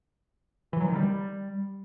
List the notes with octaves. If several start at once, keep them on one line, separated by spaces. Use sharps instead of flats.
E3
F#3
D#3
G3